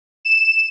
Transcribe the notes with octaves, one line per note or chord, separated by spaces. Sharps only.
E7